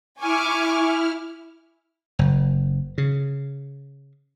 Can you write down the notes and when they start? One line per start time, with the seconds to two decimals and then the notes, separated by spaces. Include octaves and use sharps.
0.20 E4 G#5 C#6 D6 F6
2.19 F#1
2.98 C#3